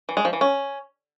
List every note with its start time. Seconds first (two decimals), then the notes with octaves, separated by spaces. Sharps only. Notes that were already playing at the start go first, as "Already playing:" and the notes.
0.09 E3
0.17 G#3
0.25 F3
0.33 E3
0.41 C#4